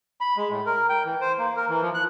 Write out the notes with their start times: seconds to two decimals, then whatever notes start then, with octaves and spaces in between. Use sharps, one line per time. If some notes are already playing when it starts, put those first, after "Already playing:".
0.21 B5
0.37 G#3
0.50 A2
0.66 A#4
0.89 G5
1.05 E3
1.21 C5
1.39 A#3
1.56 A#4
1.69 E3
1.82 F3
1.94 F#6